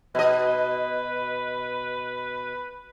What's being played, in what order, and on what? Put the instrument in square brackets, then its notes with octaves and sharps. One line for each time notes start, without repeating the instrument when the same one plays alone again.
[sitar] B2 D#5 [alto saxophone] B4